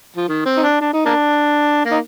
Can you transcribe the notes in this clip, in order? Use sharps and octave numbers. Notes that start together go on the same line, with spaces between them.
F3
D#3
C4
D#4
D4
D4
D#4
A#3 D4
A#3
D#4